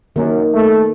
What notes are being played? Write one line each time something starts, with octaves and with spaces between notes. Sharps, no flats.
F#2 D#3 A#3
A3